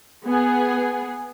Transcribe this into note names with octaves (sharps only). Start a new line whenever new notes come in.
B3 G#4